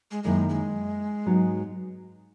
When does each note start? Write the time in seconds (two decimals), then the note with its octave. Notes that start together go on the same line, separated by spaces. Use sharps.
0.11 G#3
0.24 F#2 D#3 G#3 A#3 E4
0.49 G#3
1.26 G#2 F#3 B3 D#4